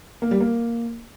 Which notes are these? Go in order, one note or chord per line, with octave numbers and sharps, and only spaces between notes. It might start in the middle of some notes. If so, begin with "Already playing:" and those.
A#3
G3
A#3